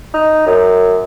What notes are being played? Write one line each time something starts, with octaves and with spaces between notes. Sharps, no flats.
D#4
F#2